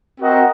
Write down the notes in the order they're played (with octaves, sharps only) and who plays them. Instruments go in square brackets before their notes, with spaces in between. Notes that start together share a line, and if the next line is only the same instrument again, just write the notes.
[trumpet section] C4 F#4 A#4 D#5